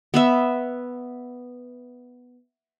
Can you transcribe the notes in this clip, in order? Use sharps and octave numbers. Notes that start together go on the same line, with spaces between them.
B3 B4 E5